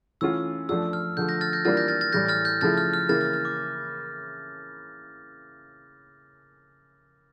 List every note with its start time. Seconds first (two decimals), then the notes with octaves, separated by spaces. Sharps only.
0.21 E3 A3 C#4 F4 E6
0.69 F3 A3 D4 F4 E6
0.93 F6
1.17 D3 F3 A3 G6
1.28 G6 A#6
1.41 F6 A6
1.53 G6 A#6
1.65 E3 G3 A#3 D4 F4 F6 A6
1.77 G6 A#6
1.88 F6 A6
2.01 F6 A6
2.12 A2 E3 G3 G6 A#6
2.28 F6 A6
2.45 G6
2.61 C#3 F3 A3 E4 F6 A6
2.77 F6
2.93 F6
3.09 C#3 E3 A#3 E4 F6 A6
3.21 F6
3.33 F6
3.45 D6